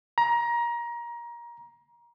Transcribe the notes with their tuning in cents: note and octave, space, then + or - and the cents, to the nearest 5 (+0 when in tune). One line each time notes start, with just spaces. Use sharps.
A#5 +20